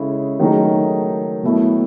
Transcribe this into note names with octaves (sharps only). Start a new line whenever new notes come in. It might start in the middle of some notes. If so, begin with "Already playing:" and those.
Already playing: C#3 G#3 C#4 E4 A4
D#3 F#3 A3 D#4 G#4
B2 F#3 A3 E4